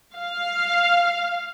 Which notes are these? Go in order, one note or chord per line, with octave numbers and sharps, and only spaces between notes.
F5